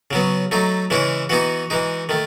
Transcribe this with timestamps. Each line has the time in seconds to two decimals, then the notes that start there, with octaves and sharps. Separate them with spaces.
0.11 C#3 F#3 B3
0.51 F#3 A3 D#4
0.90 C#3 E3 G#3 C#4 E4
1.29 E3 B3 D#4 F#4
1.70 E3 G#3 D#4
2.09 D#3 A3